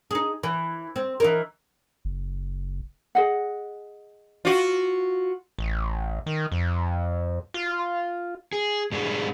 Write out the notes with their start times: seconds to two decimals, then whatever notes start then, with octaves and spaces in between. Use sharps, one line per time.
0.11 D#4 G#4
0.43 E3
0.96 C4
1.20 E3 D#4 A#4
2.05 F#1
3.15 G#4 D#5 F#5
4.45 F4 F#4
5.58 A1
6.26 D#3
6.52 F2
7.54 F4
8.53 G#4
8.92 G#2 G3 D4 E4 G#4 B4